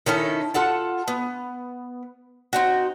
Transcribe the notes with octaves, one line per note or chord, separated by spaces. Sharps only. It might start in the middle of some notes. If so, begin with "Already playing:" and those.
D#3 C#4 E4 A4
F4 A4 F#5 A5
B3
C4 D#4 F#4